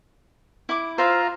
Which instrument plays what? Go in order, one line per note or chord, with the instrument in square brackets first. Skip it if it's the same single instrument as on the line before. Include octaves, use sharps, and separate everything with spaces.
[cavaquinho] E4 D6
[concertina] F4 A#5 [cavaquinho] C5 E5 F5